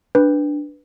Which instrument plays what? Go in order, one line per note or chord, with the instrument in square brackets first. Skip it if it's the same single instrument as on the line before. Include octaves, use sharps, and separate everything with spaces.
[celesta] D4 [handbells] B4